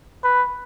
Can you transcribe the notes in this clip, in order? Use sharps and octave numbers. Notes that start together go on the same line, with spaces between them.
B4